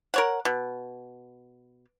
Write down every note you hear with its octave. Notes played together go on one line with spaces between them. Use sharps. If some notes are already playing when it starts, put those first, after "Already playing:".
A#4 C#5 F#5
B2